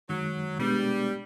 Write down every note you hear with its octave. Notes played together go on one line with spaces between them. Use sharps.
F#2 D#3 F#3 G#3
B2 G3 G#3 B3 D4